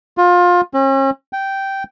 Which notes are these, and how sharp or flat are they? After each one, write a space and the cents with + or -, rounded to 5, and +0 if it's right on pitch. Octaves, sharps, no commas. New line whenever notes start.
F4 +25
C#4 -40
G5 -10